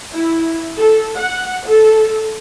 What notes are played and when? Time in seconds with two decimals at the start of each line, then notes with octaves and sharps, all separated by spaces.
0.12 E4
0.78 A4
1.17 F#5
1.66 A4